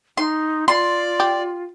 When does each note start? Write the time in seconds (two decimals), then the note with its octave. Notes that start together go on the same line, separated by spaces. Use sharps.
0.17 D#4 C6
0.68 F4 D5 C6
1.20 G4